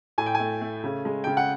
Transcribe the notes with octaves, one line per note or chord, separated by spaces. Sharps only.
A2 G#5
G5
G#5
A3
A3
C#3
G#3
C#3 G5
F#5